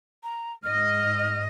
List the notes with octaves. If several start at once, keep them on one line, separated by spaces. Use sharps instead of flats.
A#5
G#2 D#5 F6